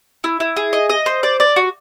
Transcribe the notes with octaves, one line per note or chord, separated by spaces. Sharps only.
E4
E4
G#4
D#5
D#5
C5
D5
D5
F#4